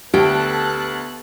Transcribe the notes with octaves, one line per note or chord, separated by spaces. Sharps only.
D2 B3 G4 A4 F#6